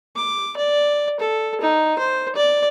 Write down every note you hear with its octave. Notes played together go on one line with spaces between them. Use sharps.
D6
D5
A4
D#4
C5
D5